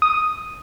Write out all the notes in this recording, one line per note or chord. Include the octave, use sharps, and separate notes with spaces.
D#6